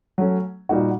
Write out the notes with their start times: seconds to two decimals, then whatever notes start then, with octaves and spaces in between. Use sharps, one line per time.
0.18 F#3 A3 C#4
0.69 A#2 G3 A#3 D#4 F#4